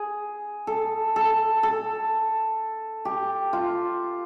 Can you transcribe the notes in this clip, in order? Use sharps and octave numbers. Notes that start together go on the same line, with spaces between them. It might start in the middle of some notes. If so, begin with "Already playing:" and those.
Already playing: G#4
A4
A4
A4
G4
F4